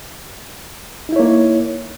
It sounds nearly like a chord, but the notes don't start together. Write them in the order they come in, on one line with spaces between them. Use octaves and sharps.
D#4 E4 C#5 A#3